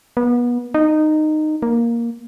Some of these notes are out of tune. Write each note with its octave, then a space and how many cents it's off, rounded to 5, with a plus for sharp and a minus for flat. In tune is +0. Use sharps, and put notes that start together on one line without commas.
B3 -30
D#4 -15
A#3 +5